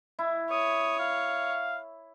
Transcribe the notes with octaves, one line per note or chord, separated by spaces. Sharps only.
E4
C#5 D#6
F5